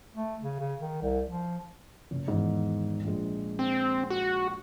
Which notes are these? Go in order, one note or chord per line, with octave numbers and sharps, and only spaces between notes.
A3
C#3
C#3
D#3
C2
F3
F#1
E2 G#2 D#3
A#1 G#3
C4
F#4